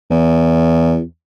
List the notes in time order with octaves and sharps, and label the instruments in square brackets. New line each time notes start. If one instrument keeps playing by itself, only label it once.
[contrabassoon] E2